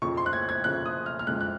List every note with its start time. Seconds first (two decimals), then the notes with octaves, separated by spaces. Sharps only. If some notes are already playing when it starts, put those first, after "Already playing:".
0.02 F2 C#3 F3 C#6
0.17 C6
0.26 F#6
0.33 G#6
0.49 G#6
0.64 F2 C#3 F3 F#6
0.86 D#6
1.06 F6
1.19 F6
1.27 F2 C#3 G#3 F#6
1.41 F#6